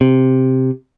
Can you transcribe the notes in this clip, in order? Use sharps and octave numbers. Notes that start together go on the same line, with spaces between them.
C3